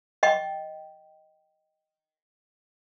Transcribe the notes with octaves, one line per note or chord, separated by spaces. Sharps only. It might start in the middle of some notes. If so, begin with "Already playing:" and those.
D#5 G5 C#6